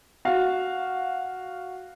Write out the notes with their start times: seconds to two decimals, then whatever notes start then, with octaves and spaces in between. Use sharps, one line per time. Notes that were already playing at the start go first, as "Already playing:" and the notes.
0.25 F#4 F5